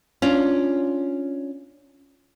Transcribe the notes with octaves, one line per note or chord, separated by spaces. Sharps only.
C#4 D4 F4